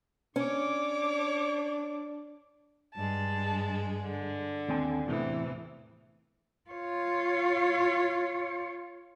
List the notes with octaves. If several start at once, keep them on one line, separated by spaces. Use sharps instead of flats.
C#4 D4 C#5 D6
G2 G#3 A5
D3
D#2 C4 G#5
E2 A2 C3 E3
F4 C#5